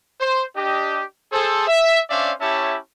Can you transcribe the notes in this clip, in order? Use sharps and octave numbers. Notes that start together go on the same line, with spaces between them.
C5
D4 G4 D#5
G#4 A4 C5
E5
C#4 D4 C5 D5 E5 F5
C#4 E4 G4 C#5 E5 A5